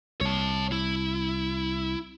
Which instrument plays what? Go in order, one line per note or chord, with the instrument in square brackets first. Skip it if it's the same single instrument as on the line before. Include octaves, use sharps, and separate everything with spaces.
[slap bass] C2 [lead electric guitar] C#5 A5
[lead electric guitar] E4